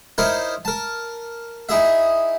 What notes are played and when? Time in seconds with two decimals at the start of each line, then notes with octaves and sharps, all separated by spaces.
0.18 D#4 E4 A#4 C5 C#5
0.65 A#4 A5
1.69 D#4 E4 G#4 E5